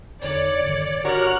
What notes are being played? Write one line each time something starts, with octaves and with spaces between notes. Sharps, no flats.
E2 D3 D#4 C#5 D5 C#7
G2 D3 D#3
D4 F#4 G4 A#4 C#5 F6 F#6